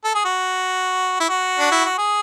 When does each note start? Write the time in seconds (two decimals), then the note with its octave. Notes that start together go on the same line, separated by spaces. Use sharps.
0.05 A4
0.14 G#4
0.25 F#4
1.20 E4
1.29 F#4
1.59 D4
1.71 E4
1.85 F#4
1.98 G#4